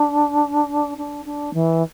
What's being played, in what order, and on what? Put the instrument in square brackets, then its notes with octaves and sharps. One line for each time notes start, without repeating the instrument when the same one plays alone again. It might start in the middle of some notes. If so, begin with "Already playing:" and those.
Already playing: [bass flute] D4
D4
D4
E3